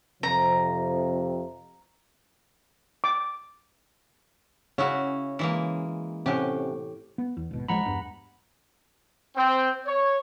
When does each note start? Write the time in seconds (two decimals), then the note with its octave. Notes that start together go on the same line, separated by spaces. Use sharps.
0.23 F2 C3 F3 A#5
3.04 D6
4.78 C#3 C#4 E4 F#4
5.39 E3 G#3 A#3
6.26 A2 C3 C#4 G4 F#5
7.18 B3
7.37 E2
7.51 G#1 B2
7.68 A1 F3 G#3 F#5 A#5 B5
7.86 E2 G2
9.35 C4 G5
9.86 C#5